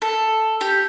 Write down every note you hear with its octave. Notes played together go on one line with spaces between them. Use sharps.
A4
G4